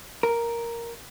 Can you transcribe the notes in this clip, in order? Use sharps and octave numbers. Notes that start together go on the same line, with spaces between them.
A#4